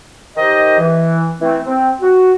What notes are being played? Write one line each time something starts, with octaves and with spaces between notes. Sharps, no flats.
D#3 G4 C5 D#5
E3
E3 A3 C4
C4
F#4